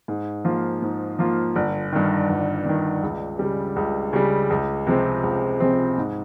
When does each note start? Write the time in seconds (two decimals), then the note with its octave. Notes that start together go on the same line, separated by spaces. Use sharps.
0.08 G#2
0.45 F3 A#3 F4
0.82 G#2
1.19 F3 A#3 F4
1.56 G1
1.93 G2 D#3
2.30 G1
2.66 G2 D#3
3.03 C#2
3.39 C#3 G3
3.76 C#2
4.13 C#3 G3
4.50 C#2
4.87 C3 F3 G#3 C4
5.23 C#2
5.60 C3 F3 G#3 C4
5.98 G#2